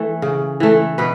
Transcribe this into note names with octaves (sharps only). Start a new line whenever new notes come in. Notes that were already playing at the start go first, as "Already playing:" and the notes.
Already playing: E3 A3
C#3
E3 A3
B2 B4